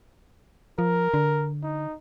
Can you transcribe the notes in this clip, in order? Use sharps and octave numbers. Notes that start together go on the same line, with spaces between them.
F3 A#4
D3
D#4